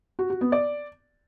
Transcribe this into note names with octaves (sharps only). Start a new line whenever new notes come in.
F#4
F#4
B3
D5